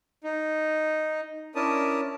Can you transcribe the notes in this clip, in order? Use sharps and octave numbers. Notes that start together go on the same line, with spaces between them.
D#4
C#4 D4 E4 A#4 A5 D#6